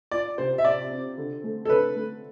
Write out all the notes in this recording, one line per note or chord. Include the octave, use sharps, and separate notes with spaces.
F4 D5
C3 C5
E5
C4 D5
C4
D3
A3
A4
D3 B4
A3